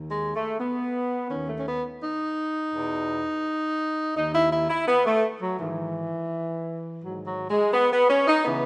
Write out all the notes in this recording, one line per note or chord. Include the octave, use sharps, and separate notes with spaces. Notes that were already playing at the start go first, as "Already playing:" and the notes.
Already playing: D#2 D#3
G#3
A3
B3
D#2 D#3 C#4
A3
C#4
B3
D#4
E2 B2
D#2 D#3 D#4
E4
E4
E4
B3
A3
F#3
G#2 D#3 E3
G#2 D#3 F#3
F#3
G#3
B3
B3
C#4
D#4
C#3 E3 B3